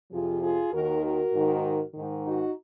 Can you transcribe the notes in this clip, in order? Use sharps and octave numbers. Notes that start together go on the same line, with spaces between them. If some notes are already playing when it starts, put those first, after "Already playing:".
F2 C3 F3 F4 G#4
F4 G#4
D#2 D#3 F#4 A#4
F#4 A#4
G#2 D#3
G#2 D#3
D#4 F#4